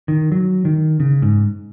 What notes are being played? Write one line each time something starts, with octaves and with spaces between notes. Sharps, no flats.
D#3
F#3
D#3
C#3
G#2